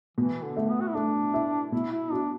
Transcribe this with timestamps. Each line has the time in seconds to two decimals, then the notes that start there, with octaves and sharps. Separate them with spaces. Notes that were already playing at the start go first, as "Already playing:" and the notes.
0.17 B2 E3
0.43 D3
0.57 A3
0.69 B3
0.80 F#4
0.88 E4
0.94 A3 D4
1.34 E4
1.72 B2 E4
1.92 E4
2.12 D4 F#4